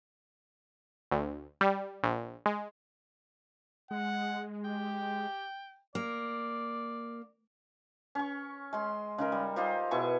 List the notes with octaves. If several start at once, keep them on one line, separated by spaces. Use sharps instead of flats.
D2
G3
A#1
G#3
G#3 F#5
G4 G5
A#3 D5
C#4 C#6
G#3 C6
C#3 D#4 A#4
G3
D#4 F4 G4 C5
B2 E4 G#4 C#6